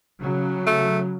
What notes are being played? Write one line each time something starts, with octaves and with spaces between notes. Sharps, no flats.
C#3 F#3
A3